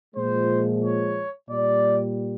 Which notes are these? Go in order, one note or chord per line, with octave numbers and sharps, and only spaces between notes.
A#2 F3 G#3 C5
C#5
A#2 G3 D5